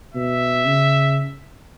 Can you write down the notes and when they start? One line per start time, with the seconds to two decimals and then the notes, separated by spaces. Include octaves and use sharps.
0.14 B2 E5
0.65 C#3